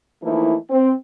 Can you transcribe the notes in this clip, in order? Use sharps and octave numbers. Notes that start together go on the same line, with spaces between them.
E3 F3 A3 A#3 D#4 E4
C4